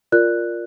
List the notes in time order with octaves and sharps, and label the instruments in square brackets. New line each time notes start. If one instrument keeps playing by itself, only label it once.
[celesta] F4 A#4 D5 F#6